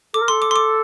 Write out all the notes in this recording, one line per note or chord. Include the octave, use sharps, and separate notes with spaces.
A4 D6
A#4
A4 C6
D6
C6
D6